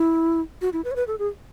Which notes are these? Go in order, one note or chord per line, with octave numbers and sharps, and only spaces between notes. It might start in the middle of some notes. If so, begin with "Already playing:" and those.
Already playing: E4
F#4
E4
B4
C#5
B4
A4
G#4